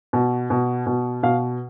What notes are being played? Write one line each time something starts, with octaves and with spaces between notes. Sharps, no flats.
B2
B2
B2
B2 F5